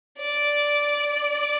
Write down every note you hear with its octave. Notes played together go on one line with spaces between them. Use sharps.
D5